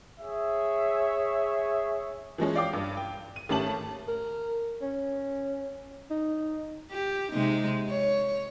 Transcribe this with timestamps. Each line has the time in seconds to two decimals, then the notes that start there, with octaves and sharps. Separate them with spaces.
0.20 G#4 C#5 E5
2.38 E3 F3 G#3 C#4
2.55 D5 F5 G5 D6
2.73 G2
2.97 G5
3.36 D#7
3.49 G#1 A3 C#4 G4 A5 F#7
4.08 A#4
4.82 C#4
6.11 D#4
6.91 G4
7.32 C3 G#3 D#4
7.89 C#5